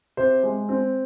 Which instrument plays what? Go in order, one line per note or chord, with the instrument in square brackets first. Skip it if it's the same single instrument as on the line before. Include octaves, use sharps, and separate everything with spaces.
[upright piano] C3 C5
G#3
C4